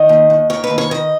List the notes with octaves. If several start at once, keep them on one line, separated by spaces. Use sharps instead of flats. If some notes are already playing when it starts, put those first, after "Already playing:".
Already playing: D#3 D#5
D#2
D#2
D#3 C#5
B4
D#2
C#5
D#3 D#5